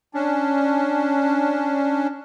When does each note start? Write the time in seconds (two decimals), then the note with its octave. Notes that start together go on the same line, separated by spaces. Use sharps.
0.14 C#4 D4